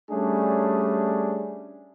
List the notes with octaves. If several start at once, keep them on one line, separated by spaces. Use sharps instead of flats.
G3 A3 C#4 D4 G#4